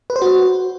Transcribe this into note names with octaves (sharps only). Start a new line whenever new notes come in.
B4
C5
F#4